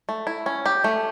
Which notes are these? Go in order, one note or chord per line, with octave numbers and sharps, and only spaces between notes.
A3
E4
C#4
G4
A3